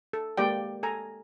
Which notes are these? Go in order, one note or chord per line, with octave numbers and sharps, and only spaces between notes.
A4
G#3 A#3 G4 D5 G5
A4 G#5 A#5